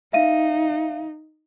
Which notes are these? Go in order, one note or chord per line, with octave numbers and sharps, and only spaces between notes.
D#4 E5 F5 D#7